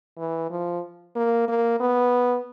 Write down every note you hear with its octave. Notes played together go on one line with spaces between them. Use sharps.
E3
F3
A#3
A#3
B3